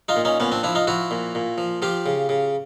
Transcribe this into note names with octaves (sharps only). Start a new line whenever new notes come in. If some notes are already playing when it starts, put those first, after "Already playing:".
D#4 F4
A#2
C#4 D#4
A#2 B3 C#4
C4 D4
F3 D4 E4
D#4 F4
F3 E4 F#4
A#2
A#2
F3
F3 F4 G4
C#3
C#3